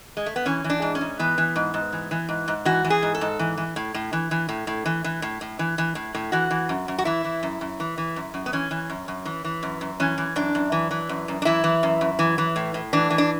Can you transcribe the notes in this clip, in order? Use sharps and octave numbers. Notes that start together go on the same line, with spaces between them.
G#3
A3
B3
E3 C#4
E3
D4
G#2
C#4
G#2
E3 B3
E3
G#2
G#2
E3
E3
G#2
G#2
E3 F#4
E3
G#4
G#2
A4
G#2
E3
E3
A2
A2
E3
E3
A2
A2
E3
E3
A2
A2
E3
E3
A2
A2
E3 F#4
E3
F#2
F#2
F#4
E3 E4
E3
F#2
F#2
E3
E3
F#2
F#2
B3
E3 C#4
E3
F#2
F#2
E3
E3
F#2
F#2
E3 C#4
E3
F#2 D4
F#2
E3
E3
F#2
F#2
D4
E3 E4
E3
F#2
F#2
E3
E3
A2
A2
E3 D4
E3
D4